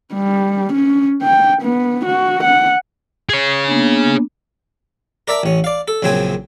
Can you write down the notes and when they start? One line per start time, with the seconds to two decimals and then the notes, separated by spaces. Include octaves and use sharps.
0.13 G3
0.73 C#4
1.22 G5
1.63 B3
2.05 F#4
2.44 F#5
3.29 G#4 C#5
3.67 A#3 B3 D4
5.28 A#4 D5 E5 A5
5.43 A1 C#4
5.64 D5 F5
5.88 A4
6.02 A#1 F#2 C#3 C4 G#5